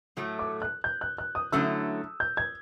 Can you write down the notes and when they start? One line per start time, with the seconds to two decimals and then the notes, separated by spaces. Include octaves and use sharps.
0.17 A2 F#3 A3
0.39 D6
0.62 F#6
0.84 G6
1.01 F#6
1.18 F#6
1.35 D#6
1.52 D3 F#3 A3 C#4 E4 E6
2.20 G6
2.37 G#6